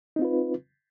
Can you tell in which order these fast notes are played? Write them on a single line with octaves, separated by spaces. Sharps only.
D#4 C4 F4 B4